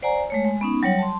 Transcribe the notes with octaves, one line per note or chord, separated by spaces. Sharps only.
C5 D5 F#5 G#5 A#5
G#3 A3 C#5
G#3
B3 C#4 D#4
F#3 G3 C#5 F#5
A5 C6